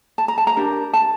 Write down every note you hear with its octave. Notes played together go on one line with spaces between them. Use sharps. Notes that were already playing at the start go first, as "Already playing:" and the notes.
A5
A#5
A5
A#5
D4 G4 A#4
A5